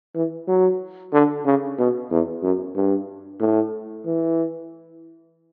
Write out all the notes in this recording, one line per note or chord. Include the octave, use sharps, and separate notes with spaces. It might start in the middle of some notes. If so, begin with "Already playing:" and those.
E3
F#3
D3
C#3
B2
E2
F#2
G2
A2
E3